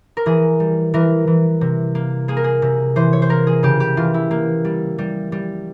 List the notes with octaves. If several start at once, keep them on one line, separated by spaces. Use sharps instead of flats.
A#4
E3 G#4
G3
E3 A#4
E3
C3
A#3
A#3 G#4
A#4
G#4
C3
E3 C5
C#5
C5
A#3 A#4
G#4
C#3 G4
G4
E3 F4
E4
A#3
G3
G3
G3